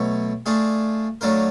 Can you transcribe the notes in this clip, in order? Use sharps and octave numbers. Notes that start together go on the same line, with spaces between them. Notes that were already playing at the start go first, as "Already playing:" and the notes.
Already playing: B2 F#3 A3
A3 D4 F4 G#4
F#3 A3 D4 F4 A#4